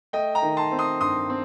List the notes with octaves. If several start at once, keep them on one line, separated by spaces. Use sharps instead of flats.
A3 D#5 G5
G5 A#5
D#3
A5 C6
C4
C6 D#6
G2 C6 D#6
C4